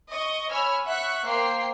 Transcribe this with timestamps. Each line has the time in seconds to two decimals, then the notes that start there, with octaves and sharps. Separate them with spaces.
0.11 D#5 C#6
0.51 C#5 G#5 B5 E6 F6
0.87 E5 F#5 C#6 F#6 C#7
1.26 A#3 C5 G5 C7